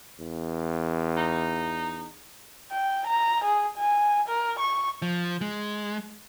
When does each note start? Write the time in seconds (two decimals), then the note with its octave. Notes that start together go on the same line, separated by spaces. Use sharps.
0.19 E2
1.17 D#4
2.71 G5
3.07 A#5
3.45 G#4
3.78 G#5
4.28 A#4
4.59 C#6
5.02 F3
5.41 G#3